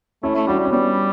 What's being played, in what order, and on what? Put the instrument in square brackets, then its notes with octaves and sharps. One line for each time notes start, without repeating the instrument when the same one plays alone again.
[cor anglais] A3 [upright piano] C#4 E4
[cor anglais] A3
[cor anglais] G3 [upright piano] D4 F#4
[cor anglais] G3
[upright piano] C#4
[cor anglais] G3 [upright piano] B3 D4